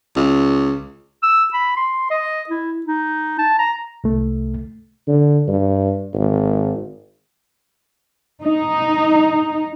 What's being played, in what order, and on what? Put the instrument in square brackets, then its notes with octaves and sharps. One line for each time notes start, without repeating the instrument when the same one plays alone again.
[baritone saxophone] C#2
[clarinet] E6
B5
C6
D#5
E4
D#4
A5
A#5
[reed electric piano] C2 A3
[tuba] D3
G2
G#1
[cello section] D#4